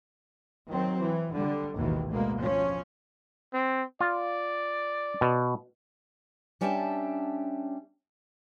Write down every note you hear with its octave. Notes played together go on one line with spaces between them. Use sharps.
D#3 F#3 C4
E3
D3 G3
A1 D#2 G#2 B2 D#3 E3
D2 B2 G#3 A#3
F3 C#4
C4
F4 D5
B2
G3 C#4 D4 E5 G5 A5